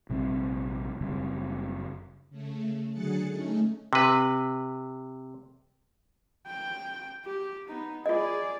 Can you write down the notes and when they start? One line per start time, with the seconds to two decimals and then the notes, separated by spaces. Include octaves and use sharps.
0.10 A#1 C3 G3 C4
1.01 F#1 C#3 G3 C4
2.30 C#3 A3
2.91 D3 F#3 G#4 F#6 A6 C#7
3.29 A3 C#4 D#4
3.93 C3 B4
6.47 G5
7.25 G4
7.68 B3 D#4
8.06 F4 G#4 D5 D#5